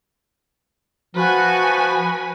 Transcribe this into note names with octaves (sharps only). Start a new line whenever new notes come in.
F3 F#4 B4 G#5